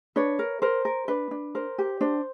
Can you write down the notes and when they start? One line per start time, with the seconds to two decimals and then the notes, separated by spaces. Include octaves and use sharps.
0.16 D4 B4 C#5
0.39 A#4
0.62 A#4 C5
0.85 A#4
1.08 D4 B4
1.31 D4
1.55 A#4 C5
1.78 G4
2.01 D4 C5